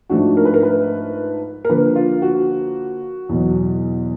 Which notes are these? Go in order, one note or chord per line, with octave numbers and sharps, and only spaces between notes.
G#2 F3 A3 D4 F#4
A#4
B4
A#4
B4
A#4
D3 F3 A#3 B4
F4
F#4
E2 B2 F#3